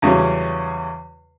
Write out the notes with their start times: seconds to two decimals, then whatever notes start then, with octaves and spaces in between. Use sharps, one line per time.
0.02 E2 C#3 F#3 G3 C#4